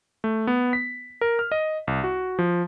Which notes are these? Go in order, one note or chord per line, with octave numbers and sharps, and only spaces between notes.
A3
B3
B6
A#4
F6
D#5
C2
F#4
F3